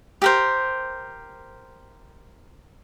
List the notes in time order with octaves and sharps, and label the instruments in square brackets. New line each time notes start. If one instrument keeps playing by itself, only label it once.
[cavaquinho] G4 A#4 C5